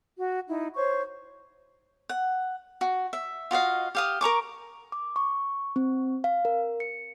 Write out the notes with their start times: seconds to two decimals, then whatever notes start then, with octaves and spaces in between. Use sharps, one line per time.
0.17 F#4
0.47 D#4 E4
0.76 C5 C#5 C#6
2.09 F#5
2.81 F#4
3.13 E5
3.51 F4 F#4 D#5 F5
3.95 G4 F5 D#6
4.21 A#4 A#5 C#6 D6
4.92 D6
5.16 C#6
5.76 C4
6.24 F5
6.45 A#4
6.80 C#7